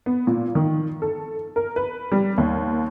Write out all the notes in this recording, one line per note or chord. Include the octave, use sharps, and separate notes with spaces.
B3
A#2
D#3
A4
A#4
B4
G3
D#2